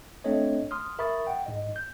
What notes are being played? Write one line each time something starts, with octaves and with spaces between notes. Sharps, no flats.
A3 C4 D4 A4 C#5 D#5
C6 D#6 F6
A#4 E5 B5 C#6 D#6 A6
F#5 G5
G#2 D#5
G6